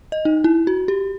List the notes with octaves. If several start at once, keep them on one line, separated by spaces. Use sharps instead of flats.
D#5
D#4
E4
F#4
G4